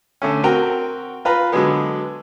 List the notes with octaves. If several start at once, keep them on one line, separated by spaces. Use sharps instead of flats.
D3 A3 C#4
C4 F#4 A#4 G5 A#5
F4 B4 A#5
D3 F#3 G#3 B3